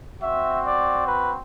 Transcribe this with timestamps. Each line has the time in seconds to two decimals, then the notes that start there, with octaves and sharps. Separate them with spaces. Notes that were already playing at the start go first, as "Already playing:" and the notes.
0.21 C4 F#4 E5
0.64 D5
1.06 B4